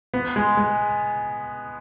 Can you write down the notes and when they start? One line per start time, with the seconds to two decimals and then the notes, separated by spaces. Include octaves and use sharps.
0.14 B3
0.36 G#3
0.57 G#3